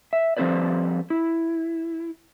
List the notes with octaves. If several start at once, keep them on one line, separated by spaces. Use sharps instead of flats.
E5
F3 G3 C4 A4 B4 D5
E4